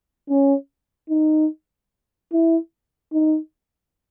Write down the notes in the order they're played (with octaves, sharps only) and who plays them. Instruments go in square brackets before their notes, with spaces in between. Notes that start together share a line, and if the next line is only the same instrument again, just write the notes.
[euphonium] C#4
D#4
E4
D#4